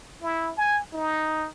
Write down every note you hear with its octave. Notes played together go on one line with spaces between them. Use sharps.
E4
G#5
D#4